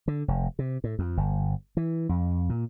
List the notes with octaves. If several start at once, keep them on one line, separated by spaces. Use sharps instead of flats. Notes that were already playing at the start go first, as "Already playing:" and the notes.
D3
F1
C3
A2
F2
G1
E3
F2
A#2